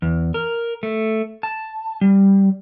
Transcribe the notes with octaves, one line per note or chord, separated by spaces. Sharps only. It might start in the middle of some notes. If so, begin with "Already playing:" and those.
E2
A#4
A3
A5
G3